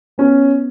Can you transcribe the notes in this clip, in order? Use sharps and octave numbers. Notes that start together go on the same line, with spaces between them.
B3 C#4